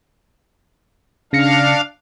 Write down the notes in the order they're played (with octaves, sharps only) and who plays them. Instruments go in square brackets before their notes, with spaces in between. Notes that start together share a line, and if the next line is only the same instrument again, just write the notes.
[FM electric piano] C#3 A#6 C#7 [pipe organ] D4 F5